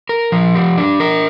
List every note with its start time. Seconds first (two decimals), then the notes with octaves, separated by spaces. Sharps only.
0.09 A#4
0.32 F3
0.55 G4
0.78 D4
1.00 A#4